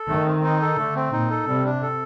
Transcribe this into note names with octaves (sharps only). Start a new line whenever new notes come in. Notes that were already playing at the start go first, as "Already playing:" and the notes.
Already playing: A4
D#3 A3
C4
D#4
A4
D3 A3
C4
A#2 D#4
A4
C3 G3
D4
A4